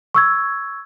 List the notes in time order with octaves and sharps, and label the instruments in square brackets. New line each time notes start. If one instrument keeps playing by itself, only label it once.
[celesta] C#6 E6 G#6